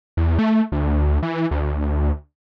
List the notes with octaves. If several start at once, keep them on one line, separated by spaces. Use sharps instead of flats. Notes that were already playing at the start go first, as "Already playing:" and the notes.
E2
A3
D2
E3
D2